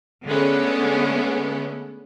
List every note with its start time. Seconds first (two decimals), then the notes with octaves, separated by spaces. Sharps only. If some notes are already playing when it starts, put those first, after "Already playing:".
0.25 D3 G#3 A3 B3 C#4